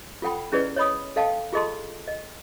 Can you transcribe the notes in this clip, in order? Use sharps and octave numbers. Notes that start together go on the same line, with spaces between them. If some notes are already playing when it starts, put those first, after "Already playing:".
F4 A4 F#5 G5 B5
C#4 E4 G#4 B4 D5 D#5
C#5 D#5 B5 D#6
A4 D#5 F5 G5 A5
F4 G#4 A4 D#5 A5 C6
D#5